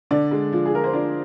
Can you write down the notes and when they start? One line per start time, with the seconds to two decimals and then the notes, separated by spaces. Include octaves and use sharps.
0.11 D3 D4 D5
0.31 G#3
0.52 F3
0.66 G#4
0.73 F3 A#4
0.84 C5
0.93 F3 D4 D5